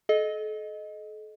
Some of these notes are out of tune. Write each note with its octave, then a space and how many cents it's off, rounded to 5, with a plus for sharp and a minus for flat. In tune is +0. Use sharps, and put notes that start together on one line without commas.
A4 -40 D#5 -5